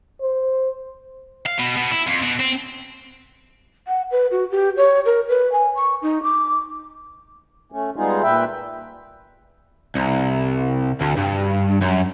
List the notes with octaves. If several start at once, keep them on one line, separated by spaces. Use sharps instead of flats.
C5
F5
B2
B2
E4
F2
B2
C4
F#5
B4
F#4
G4
C#5
A#4
B4
G#5
C#6
D#4
D6
A3 C#4
G3 G#3 B3 D#4 F4 G#4
A#2 B4 E5 G5
C2
D2
G2
F#2